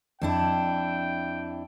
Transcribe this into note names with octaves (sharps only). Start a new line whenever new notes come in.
F2 D4 E4 G5